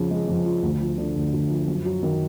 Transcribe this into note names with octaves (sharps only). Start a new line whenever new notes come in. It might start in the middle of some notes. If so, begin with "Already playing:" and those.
Already playing: F2 C#3 F3
G#3
F2
F3
D2
F3
D3
D2
D2
F3
F#2
F#3
D#3